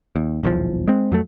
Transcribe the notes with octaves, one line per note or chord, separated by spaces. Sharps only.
D#2
D#1 B1 E2 F3
G#3 C4
F2 F#3 A3